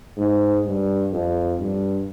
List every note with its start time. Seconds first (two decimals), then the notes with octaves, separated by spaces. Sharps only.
0.17 G#2
0.65 G2
1.12 F2
1.59 G2